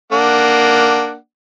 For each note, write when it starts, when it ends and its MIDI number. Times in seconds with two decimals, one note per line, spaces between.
0.12 1.16 58
0.12 1.16 62
0.12 1.16 78